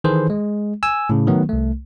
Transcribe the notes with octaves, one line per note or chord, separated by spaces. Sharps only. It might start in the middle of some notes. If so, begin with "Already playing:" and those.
D#3 E3 G#4 A4 B4 C5
G#3
G#5 E6
A2 C#3
D#3 F#3 A3 B3
C2 A3